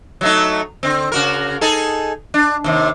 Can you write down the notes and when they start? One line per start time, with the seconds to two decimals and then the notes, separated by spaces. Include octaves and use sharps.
0.21 F#3 A3 D#4
0.83 D3 C4
1.12 C#3 F#4 A#4
1.61 D#4 G#4 A4
2.34 D4
2.64 D#2 C3